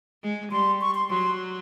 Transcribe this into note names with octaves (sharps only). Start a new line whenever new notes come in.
G#3
G3 C6
C#6
C6
F#3 C6